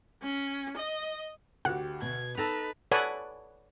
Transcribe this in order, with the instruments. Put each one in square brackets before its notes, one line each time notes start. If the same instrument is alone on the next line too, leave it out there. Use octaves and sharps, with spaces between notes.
[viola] C#4
D#5
[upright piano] D2 F#4 [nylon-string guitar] G4 [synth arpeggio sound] F#5
[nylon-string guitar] B2 [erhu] G#6
[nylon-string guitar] D#4 A4 [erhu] B4 [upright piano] A6 A#6 F7
[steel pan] A4 B4 C#5 D5 F#5 G#5